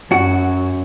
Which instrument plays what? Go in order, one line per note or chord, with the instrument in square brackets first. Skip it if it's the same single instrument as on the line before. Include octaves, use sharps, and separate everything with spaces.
[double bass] F#2 [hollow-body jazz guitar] F#4